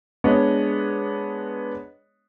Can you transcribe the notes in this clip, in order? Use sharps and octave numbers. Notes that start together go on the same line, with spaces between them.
G#3 B3 D4 C#5 D#5